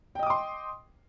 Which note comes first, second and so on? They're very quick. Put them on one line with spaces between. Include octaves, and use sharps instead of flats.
G5 D#5 D#6 D6 C6